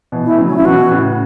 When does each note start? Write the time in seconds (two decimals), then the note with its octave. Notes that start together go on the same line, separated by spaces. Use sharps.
0.12 B2 E3
0.25 E4
0.31 A3
0.38 C#3 F#3
0.47 C#4
0.56 C#3 E4
0.65 B2 E3 F#4
0.82 E3
0.91 A2 C#3